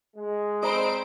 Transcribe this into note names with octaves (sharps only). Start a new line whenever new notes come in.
G#3
C4 C5 D#5 A#5 B5 D7